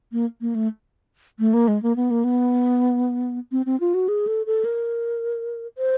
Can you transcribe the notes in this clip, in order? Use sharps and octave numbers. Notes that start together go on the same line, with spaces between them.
A#3
A#3
A3
A3
A#3
G#3
A#3
B3
A#3
B3
C4
C4
F4
F#4
G#4
A4
A4
A#4
C5